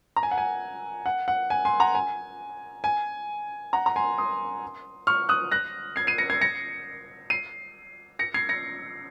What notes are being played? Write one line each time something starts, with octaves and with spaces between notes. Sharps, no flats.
A#5
G#5
F#5
G#5
F#5
F#5
G#5
G#5 C6
F#5 A#5
G#5
G#5
F#5 A#5
A#5
G#5 C6
C6 D#6
C#6 F6
D#6 F#6
F#6 A#6
G#6 C7
C7 D#7
A#6 C#7
G#6 C7
A#6 C#7
C7 D#7
A#6 C#7
G#6 C7
A#6 C#7